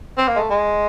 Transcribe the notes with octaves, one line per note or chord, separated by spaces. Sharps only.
C4
A#3
G#3
A3
G#3